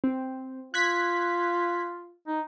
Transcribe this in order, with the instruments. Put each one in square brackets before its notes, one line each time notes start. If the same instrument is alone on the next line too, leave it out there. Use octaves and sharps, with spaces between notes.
[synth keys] C4
[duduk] F4 [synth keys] F#6 G#6 B6
[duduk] D#4